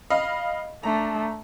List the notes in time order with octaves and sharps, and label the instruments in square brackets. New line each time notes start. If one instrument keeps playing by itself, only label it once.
[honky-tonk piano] D#5 F5 B5
[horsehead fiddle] A3 D4 [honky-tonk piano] A#5